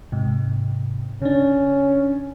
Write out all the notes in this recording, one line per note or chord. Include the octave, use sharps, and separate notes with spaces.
G#2 C3
C#3 C#4 D4